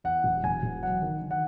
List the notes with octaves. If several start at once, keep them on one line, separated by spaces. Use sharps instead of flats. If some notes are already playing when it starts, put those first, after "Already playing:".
E2 F#5
E1
E1 G#5
E1
F#3 F#5
D#3
D#3
F#5